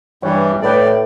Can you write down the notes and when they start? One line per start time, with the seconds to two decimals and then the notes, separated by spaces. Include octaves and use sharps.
0.23 G2 E3 G3 C#5
0.62 A2 A4 B4 D5 G5